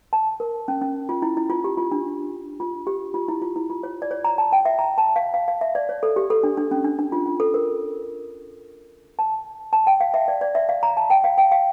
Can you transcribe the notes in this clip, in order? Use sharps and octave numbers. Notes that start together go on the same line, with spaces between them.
A5
A#4
C#4
C#4
F4
E4
E4
F4
G4
F4
D4
F4
G4
F4
E4
F4
E4
F4
C#5
D5
C#5
A#5
A5
G5
E5
A#5
A5
F5
F5
F5
E5
D5
C#5
A4
G4
A4
D4
D4
C#4
D4
D4
F4
F4
A4
A#4
A5
A5
G5
F5
E5
D5
D5
E5
F5
A#5
A5
G5
F5
G5
F5